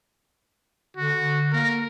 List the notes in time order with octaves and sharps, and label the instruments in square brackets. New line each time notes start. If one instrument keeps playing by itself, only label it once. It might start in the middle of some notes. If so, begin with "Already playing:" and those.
[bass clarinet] D3 [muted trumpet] F#4
[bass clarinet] A#3 [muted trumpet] A#4